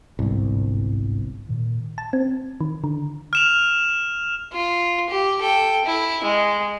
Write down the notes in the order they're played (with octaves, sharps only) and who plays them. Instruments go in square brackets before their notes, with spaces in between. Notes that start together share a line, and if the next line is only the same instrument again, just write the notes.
[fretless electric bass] G1 C2 [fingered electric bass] G#2
[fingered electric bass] A#2 D#3
[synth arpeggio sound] A5
C4
D#3
D3
[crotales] F6 E7 F7
[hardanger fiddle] F4
G4
A4 G5
E4
G#3